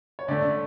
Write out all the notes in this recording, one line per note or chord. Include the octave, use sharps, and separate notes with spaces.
C#5
D3 A3 D5